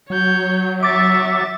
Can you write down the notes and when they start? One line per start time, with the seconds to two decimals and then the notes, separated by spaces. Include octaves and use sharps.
0.10 F#3 C#5 G6
0.83 E5 C#6 D6 A6